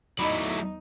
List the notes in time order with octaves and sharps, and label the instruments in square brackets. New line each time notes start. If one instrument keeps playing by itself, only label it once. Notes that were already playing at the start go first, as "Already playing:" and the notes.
[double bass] E2 D#4 [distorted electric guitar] F#3 A3 [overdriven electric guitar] E4 D5 [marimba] D#5 B5